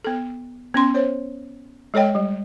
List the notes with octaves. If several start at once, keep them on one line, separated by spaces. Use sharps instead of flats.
B3 A4
B3 C#4 C6
C5 C#5
G#3 A4 C#5 D#5 G5
G3